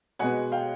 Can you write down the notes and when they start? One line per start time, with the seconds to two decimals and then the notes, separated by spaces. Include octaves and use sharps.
0.19 B2 G#3 B3 F#5 G#5
0.52 F5 G5